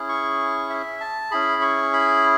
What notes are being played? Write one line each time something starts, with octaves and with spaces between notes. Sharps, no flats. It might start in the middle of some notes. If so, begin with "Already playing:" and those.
Already playing: C#4 E4 G#4
C#6
E5
A5
C#4 E4 G#4 B5
C#6
B5